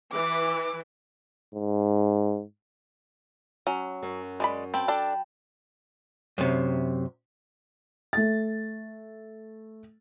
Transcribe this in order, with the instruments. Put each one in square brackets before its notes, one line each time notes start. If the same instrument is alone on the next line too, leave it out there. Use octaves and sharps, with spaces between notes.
[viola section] E3 [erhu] D6
[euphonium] G#2
[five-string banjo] F#3 C#4
[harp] F#2
[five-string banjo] G#3 D5 B5
[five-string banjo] C4 [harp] G5 A5 B5
[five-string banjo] D4 A4 D5
[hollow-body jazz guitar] F#2 C3
[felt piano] A3 A6